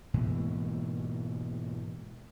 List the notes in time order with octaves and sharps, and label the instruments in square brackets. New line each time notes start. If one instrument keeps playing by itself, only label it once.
[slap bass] G#2 B2 E3 A#3